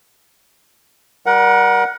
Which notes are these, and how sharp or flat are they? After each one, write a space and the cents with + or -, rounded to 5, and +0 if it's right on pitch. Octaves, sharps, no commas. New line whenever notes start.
G3 -5 A#4 +30 F#5 +0